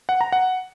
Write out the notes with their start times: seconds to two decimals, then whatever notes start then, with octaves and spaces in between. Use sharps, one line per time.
0.09 F#5
0.21 A#5
0.32 F#5